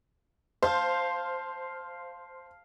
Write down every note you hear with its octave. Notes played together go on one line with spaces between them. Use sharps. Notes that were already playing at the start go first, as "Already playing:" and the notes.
C5 F5 A5